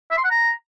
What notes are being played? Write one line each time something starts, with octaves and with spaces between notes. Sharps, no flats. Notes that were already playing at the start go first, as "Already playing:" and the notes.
E5
C6
F#5
A#5